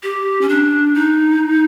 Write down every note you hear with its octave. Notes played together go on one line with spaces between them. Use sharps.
G4
C#4
D4
D#4